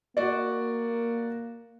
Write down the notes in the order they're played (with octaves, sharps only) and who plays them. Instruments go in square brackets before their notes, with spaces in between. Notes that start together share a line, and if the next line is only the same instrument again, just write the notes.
[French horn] A#3 [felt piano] F#4 D5